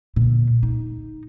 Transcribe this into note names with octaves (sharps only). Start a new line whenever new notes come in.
A#2 D3
D#4